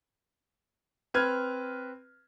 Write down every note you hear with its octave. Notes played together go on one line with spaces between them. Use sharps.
C4 B4 F6 G#6